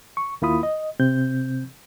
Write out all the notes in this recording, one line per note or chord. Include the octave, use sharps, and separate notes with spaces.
C#6
D#2 A#3 E4 F4 B5 D#6
D#5
C3 C4 G6